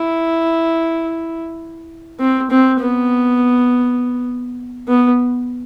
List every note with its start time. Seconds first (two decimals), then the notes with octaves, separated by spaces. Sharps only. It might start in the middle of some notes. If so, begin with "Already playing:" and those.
Already playing: E4
2.20 C4
2.51 C4
2.80 B3
4.88 B3